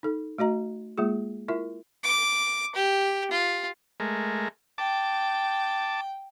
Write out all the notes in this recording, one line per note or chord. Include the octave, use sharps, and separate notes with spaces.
D#4 A4
A3 F#4 D#5 A#5
G#3 A#3 F4 G#4
E4 F4 A#4 E5
D6
G4
F4
G#3 A3 A#4
G5 A5 D6